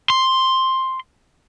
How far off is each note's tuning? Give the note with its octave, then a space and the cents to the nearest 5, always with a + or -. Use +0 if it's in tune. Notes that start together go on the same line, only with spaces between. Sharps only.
C6 +5